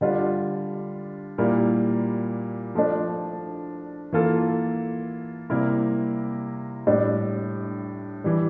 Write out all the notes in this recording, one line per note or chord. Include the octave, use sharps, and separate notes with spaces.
D3 G3 D4 F4
A#2 G3 A#3 E4
F3 A3 D4
E3 A#3 F4 A4
C3 G3 A#3 E4 A#4
A2 G3 D4
E3 G3